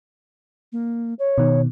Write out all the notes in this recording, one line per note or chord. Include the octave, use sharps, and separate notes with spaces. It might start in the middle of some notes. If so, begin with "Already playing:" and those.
A#3
C#5
B2 D#3